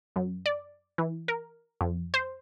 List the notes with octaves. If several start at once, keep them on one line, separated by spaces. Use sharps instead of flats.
F#2
D5
E3
A#4
F2
C5